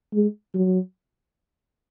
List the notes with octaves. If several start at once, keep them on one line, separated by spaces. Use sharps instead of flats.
G#3
F#3